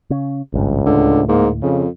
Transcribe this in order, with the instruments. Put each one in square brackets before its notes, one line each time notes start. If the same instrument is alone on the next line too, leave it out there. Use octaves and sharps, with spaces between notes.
[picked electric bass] C#3 C#4
[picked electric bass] G#1 G2 [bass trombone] C#2
[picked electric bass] D2 A2 [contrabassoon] D3
[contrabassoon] G#2 [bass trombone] A#3
[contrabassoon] F2 [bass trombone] C#3